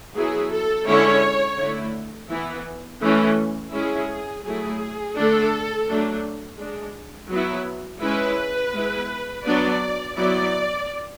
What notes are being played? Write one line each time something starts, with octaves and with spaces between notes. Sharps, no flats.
F#3 B3 E4 G#4
A4
D3 G#3 C#4 E4 C#5
D3 A3 E4
E3 B3 E4
E3 A3 C#4 E4
G#3 C#4 E4 G#4
F#3 A3 E4 G#4
D3 A3 D4 A4
F#3 A3 D4
G#3 D4
F#3 B3 E4
G#3 C#4 E4 B4
G#3 B3 E4
F#3 B3 D4 D5
F#3 B3 E4 D5